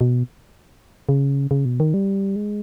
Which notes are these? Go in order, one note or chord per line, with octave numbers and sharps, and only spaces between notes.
B2
C#3
C#3
B2
D#3
G3
G#3